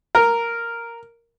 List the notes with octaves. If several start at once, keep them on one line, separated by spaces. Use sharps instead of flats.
A#4